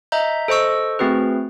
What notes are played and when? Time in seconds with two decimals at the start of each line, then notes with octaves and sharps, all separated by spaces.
0.12 D#5 E5 A#5 G6
0.48 A4 C5 D#5 C#6 E6
0.99 A3 C4 F#4 G#4 B4